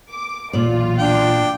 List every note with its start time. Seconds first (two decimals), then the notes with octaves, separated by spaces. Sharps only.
0.11 D6
0.53 B1 E2 A#2 F4 D5
0.98 D4 G5